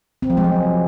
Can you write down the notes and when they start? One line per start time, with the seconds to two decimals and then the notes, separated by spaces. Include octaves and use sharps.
0.22 C4
0.30 F3
0.37 G#3
0.44 F#3